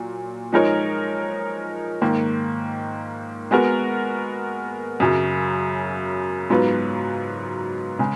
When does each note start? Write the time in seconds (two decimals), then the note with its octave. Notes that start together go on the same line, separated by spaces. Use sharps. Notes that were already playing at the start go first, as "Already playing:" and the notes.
Already playing: A#2 F#3
0.52 F3 G#3 D#4 A#4 C#5
2.02 G#2 D#3 A#3
3.51 G#3 B3 F#4 A#4
5.00 F#2 C#3 F#3
6.50 G#2 F#3 B3 F4 B4
7.99 C#3 G#3